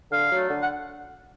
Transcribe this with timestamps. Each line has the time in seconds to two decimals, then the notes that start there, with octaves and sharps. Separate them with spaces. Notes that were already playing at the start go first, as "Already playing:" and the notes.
0.11 D3 F5
0.31 F#3 A3
0.50 D3
0.60 F#5